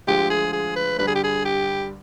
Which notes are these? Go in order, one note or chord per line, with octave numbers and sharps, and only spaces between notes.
D2 D3 F3 G#3 G4
G#4
G#4
B4
G2 D3 G3 B4
G#4
G4
G#4
G4